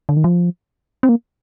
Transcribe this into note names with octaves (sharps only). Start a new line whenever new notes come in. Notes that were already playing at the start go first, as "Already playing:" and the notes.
D3
D#3
F3
C4
A#3